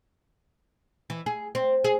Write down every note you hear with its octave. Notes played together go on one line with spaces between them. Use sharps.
E3
G#4
C4
G#4